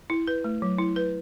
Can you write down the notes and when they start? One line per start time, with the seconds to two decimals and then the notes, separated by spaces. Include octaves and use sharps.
0.10 E4
0.28 B4
0.44 A3
0.62 F#3
0.78 E4
0.96 B4